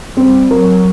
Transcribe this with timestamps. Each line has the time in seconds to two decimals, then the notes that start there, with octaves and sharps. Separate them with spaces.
0.17 G3 C4
0.50 F#3 A#4